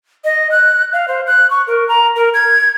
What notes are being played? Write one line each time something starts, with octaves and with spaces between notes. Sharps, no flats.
D#5
F#6
F5
C5
F#6
C#6
A#4
A#5
A#4
G#6